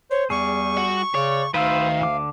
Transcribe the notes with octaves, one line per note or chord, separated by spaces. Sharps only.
C5 C#5
E2 G3 G#4 C#6
F#4
C#3 C#5 D5
D2 D#3 B4 C5 F5 E6
D3 D6